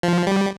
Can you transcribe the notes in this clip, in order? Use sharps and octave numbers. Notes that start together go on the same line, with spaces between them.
F3
G3